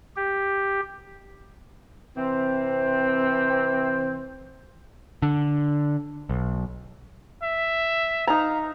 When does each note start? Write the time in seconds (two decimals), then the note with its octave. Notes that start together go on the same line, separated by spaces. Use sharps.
0.16 G4
2.15 C3 E3 C4
5.22 D3
6.29 B1
7.43 E5
8.27 D#4 F5 A#5